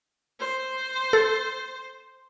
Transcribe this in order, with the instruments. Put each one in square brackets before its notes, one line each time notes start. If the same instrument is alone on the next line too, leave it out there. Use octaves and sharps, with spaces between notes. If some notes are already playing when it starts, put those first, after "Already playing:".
[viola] C5
[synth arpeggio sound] A4